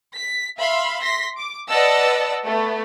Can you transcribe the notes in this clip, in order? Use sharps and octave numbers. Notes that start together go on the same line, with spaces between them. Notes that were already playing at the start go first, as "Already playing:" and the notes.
B6
E5 F5 B5 C6
C6 A#6 B6
D6
B4 D5 D#5 F#5 A5 E6
A3 B3